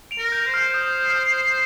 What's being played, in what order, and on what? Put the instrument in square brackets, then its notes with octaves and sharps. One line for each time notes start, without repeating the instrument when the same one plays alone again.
[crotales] D7 F7
[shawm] A#4
[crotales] G6
[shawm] C5
[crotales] F6
D#6
F6
D#6